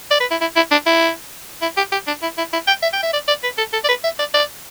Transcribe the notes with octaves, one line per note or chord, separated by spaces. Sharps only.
D5
B4
E4
E4
E4
D4
E4
E4
G4
G4
D4
E4
E4
E4
G5
E5
G5
E5
D5
D5
B4
A4
A4
D5
B4
E5
D5
D5